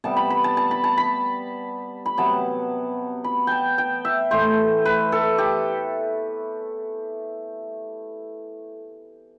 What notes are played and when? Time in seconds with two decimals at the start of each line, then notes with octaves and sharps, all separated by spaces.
0.04 C3 G3 B3 A5
0.17 B5
0.30 B5
0.44 A5
0.57 A5
0.71 B5
0.84 A5
0.97 B5
2.06 B5
2.18 C3 F#3 B3 A5
3.24 B5
3.47 G5 A5
3.78 G5
4.05 E5
4.31 A2 E3 A3 C5
4.85 B4
5.12 A4
5.38 G4